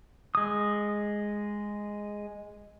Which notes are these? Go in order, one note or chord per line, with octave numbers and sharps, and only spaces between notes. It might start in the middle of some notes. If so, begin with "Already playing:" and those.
G#3 D#6